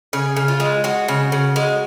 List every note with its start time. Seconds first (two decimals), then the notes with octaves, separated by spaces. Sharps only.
0.13 C#3 G#4
0.36 C#3
0.48 F4
0.60 G#3
0.84 G#3 F#4
1.08 C#3
1.32 C#3
1.56 G#3